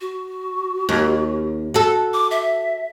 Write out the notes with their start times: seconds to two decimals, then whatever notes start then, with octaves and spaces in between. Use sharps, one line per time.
0.01 F#4
0.89 D#2
1.74 F#4 A4
2.13 D6
2.31 E5